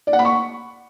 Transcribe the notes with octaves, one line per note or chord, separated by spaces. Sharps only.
D5
F#5
B5
C#6